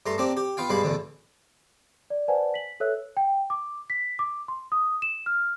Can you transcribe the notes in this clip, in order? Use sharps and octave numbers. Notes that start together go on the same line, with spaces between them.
G2 A3 A#5 C6
A#3 C4 D4 G4
G4
B3 F4 F5 G5
G2 B2 G3 G#3 F5 B5
A1 E2 B2 D3
D5
B4 C5 D5 F#5 G#5 A5
B6 F#7
A4 B4 C#5 E5 E6 F#6
G5
D6
B6
D6
C6
D#6
E7
F6